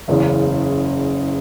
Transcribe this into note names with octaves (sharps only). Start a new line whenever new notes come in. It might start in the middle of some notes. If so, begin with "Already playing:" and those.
F#1 E2 C#3